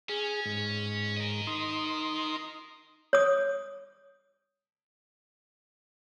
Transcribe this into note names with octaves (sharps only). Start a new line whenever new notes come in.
C#4 G#4
G#2
A#4 D#5
D#4 C6 D#6
C#5 D#6